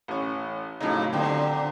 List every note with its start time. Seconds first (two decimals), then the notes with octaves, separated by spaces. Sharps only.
0.08 A1 C#4
0.80 F2 A2 C#3 F#3 D#4
1.13 A#2 D3 C4 G4